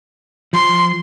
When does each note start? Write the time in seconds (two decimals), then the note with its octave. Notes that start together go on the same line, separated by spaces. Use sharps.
0.53 F3 C6